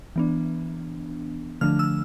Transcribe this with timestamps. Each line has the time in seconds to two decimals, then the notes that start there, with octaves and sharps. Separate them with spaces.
0.16 E3 B3 D4
1.61 D3 F3 A3 D4 F6
1.79 E6